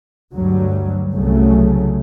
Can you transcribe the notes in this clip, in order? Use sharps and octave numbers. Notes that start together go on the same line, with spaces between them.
D2 G2 F#3 G3
C2 C#3 F#3 A3